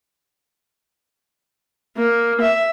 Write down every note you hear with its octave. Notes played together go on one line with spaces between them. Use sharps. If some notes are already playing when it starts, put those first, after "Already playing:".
A#3
E5